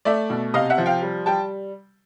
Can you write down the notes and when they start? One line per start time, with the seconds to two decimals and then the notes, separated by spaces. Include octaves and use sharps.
0.05 A3 D5 E5
0.30 B2
0.54 C3 D#5 F5
0.70 E5 F#5
0.78 F3
0.86 F5 G5
1.02 G3
1.26 G3 G5 A5